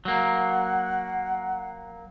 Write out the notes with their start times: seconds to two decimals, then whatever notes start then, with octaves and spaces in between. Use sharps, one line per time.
0.05 F#3 A#3 F#5